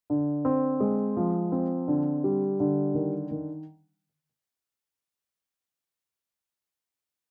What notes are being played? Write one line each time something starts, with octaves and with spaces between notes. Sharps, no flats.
D3
C4
G#3
F3
C4
D3
G3
D3
D#3
D#3